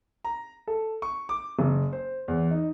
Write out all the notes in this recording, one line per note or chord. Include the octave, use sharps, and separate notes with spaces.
A#5
A4
C#6
D6
F#1
C5
E2
D#4